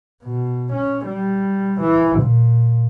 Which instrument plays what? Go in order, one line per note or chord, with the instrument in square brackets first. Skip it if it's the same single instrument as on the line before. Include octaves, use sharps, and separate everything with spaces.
[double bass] B2
C#4
G3
E3
A#2